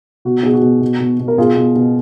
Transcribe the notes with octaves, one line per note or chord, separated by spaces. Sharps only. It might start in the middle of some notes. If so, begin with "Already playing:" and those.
B2 F#4
B2 G#4
F#4
B2
B2
B2
B2
A#4
B2 F4 G#4
B2
B2